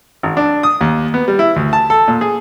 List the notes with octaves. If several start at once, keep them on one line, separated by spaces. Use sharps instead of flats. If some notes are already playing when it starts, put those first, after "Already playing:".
G#1
D4
D#6
D#2
B3
G3
E4
D2
A5
A4
A#2
G#4